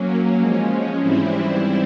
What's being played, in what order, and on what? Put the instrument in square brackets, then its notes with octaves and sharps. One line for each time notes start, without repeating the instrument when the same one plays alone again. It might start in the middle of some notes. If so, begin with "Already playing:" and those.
Already playing: [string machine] F#3 A#3 C#4
F3 G#3 C#4
G#2 E3 G3 C4 E4